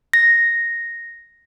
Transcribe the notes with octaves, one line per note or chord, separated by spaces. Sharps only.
A#6